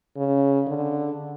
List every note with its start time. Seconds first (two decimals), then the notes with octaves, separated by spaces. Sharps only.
0.17 C#3
0.67 D3